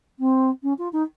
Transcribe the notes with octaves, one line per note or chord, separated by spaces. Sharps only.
C4
C#4
F4
D#4